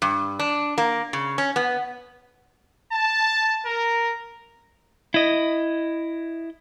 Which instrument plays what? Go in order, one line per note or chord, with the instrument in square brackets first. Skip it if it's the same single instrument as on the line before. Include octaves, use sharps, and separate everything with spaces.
[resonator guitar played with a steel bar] G2
D4
A#3
C#3
C#4
B3
[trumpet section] A5
A#4
[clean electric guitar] E4 D#5